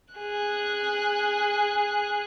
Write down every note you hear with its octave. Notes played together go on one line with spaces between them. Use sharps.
G#4 F#6